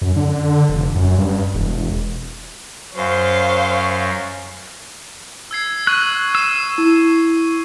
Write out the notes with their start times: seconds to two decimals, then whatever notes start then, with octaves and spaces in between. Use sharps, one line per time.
0.02 F#2
0.17 D3
0.69 F1
0.95 F#2
1.18 G2
1.54 E1
2.96 F#2 C5 C#5 F5
5.51 E6 G#6 C7
5.87 C#6 F#6 D#7
6.35 E6 C7 D#7
6.78 E4